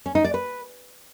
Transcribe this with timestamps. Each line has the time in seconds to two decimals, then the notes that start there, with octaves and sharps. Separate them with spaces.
0.06 C#4
0.15 D#4
0.24 D5
0.34 B4